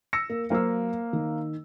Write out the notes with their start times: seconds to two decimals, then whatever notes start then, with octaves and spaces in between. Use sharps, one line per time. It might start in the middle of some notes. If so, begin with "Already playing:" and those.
0.13 E6 A#6 C#7
0.30 A#3
0.50 F#3 A#3 C5 F5 E6
1.13 D#3